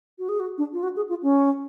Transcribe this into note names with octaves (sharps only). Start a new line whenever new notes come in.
F#4
G#4
F#4
D4
F4
F#4
G#4
F4
C#4